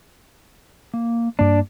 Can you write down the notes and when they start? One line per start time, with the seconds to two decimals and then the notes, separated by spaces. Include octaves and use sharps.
0.94 A#3
1.39 G2 A#3 D4 D5